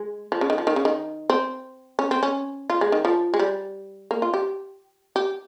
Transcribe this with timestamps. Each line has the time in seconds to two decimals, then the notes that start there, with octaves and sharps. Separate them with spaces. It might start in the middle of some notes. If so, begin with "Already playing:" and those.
Already playing: G#3
0.32 F3
0.41 C#3
0.50 D#3
0.58 F3
0.67 D#3
0.76 C#3
0.85 D#3
1.30 C4
1.99 C#4
2.11 C4
2.23 C#4
2.70 F4
2.81 G#3
2.92 D#3
3.05 F3
3.34 G#3
3.39 G3
4.11 A#3
4.22 F4
4.34 G4
5.16 G4